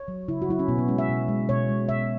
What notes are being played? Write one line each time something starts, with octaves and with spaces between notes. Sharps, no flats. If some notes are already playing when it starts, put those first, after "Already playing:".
Already playing: C#5
F#3
C#3 E4
F#4
F#3 E4
C#4
B2 B3
B3
G#3 C#4
E5
B2
G#3
B2 C#5
G#3
B2 E5